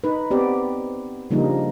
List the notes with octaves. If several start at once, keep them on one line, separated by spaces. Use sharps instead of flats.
D#4 B4
B3 C4 G4 D5
C#3 F3 G3 A#3 D4 D#4